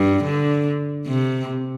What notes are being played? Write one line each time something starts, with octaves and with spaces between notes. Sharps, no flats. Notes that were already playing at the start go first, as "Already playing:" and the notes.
Already playing: G2
D3
C3